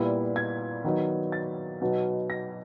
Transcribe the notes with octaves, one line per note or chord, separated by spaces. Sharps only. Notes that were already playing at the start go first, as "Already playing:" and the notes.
Already playing: A#2 G3 B3 E4
G#6
D#3 F#3 B3 D#4
A6
B2 F#3 B3 D#4
A#6